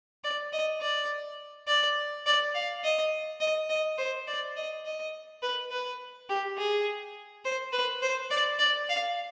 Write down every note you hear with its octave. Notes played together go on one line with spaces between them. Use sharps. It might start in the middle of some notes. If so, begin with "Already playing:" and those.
D5
D#5
D5
D5
D5
F5
D#5
D#5
D#5
C5
D5
D#5
D#5
B4
B4
G4
G#4
C5
B4
C5
D5
D5
F5